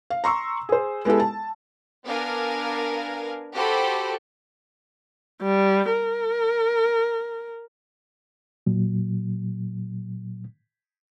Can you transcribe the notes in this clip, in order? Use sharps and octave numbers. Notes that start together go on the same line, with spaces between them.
F5
A#5 C6 C#6 E6
G#4 C5
G#3 B3 E4 G4 A4
A5
B3 D4 A#4 F5 G#5
F#4 G4 A4 C5 B5
G3
A#4
A#2 F#3